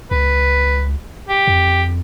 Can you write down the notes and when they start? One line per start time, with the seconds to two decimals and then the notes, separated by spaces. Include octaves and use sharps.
0.11 C#2 B4
1.29 G4
1.47 F2